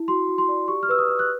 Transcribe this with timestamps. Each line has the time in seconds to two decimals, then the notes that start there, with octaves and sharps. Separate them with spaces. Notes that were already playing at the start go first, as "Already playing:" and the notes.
Already playing: E4
0.08 F#4 C6
0.28 F#4
0.38 C6
0.48 D5
0.68 G4 C#6
0.83 F6
0.89 B4 E6
0.98 D#6
1.08 B4
1.19 F#6